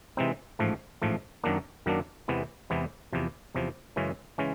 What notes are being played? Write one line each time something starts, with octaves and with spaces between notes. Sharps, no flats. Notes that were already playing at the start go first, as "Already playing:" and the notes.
C3 E3 G#3 C4 D#4
A1 G#2 F3 A3
A1 G#2 F3 A3
F#2 D#3 F#3 A#3 D4
F#2 D#3 F#3 A#3 D4
E2 C3 E3 G#3 B3
E2 C3 E3 G#3 B3
E2 C3 F3
E2 C3 F3
F#2 C#3 E3 G#3 C#4
C#3 E3 G#3 C#4